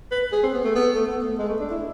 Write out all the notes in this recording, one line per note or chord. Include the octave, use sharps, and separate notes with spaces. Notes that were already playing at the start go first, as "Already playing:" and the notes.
B4
G#4
C4
B3
A3
B3
A3
B3
A3
G#3
A3
D4
E4